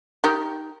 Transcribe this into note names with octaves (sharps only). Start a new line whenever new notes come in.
D#3 G4 A#4